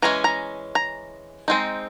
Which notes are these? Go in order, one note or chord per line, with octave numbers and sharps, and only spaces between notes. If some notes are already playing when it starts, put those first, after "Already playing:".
E3 G#3 C#4 A#5
A#5
A#5
G#3 C4 D#4